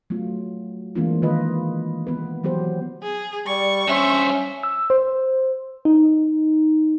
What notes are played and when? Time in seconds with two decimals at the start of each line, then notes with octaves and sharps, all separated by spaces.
0.10 F#3 A3 B3 F4
0.95 E3 G#3 A#3 C4 D4 F4
1.22 D#3 F4 B4 D#5
2.07 B3 B4
2.44 E3 F#3 B3 G4 C5
3.03 G#4
3.47 G3 D5 C#6
3.88 G2 C#4 C5 E5
4.63 E6
4.90 C5
5.85 D#4